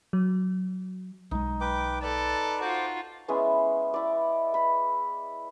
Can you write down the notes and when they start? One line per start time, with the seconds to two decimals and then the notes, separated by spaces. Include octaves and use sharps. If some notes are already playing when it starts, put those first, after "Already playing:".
0.13 F#3
1.31 B1 G#3 D#4
1.61 B4 G5 D6
2.02 A4 B4 D5
2.61 F4 F#4 C5 D6
3.28 G#3 B3 C#4 E4
3.94 E4 D5
4.54 B5